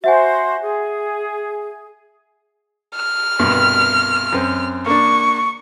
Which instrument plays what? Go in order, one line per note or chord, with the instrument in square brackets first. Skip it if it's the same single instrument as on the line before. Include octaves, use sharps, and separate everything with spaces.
[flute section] F#4 C5 [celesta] E5 F#5 G#5
[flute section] G#4
[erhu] F6
[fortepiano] C2 G2 B2
F#2 C4
[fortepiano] A#3 D4 [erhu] C#6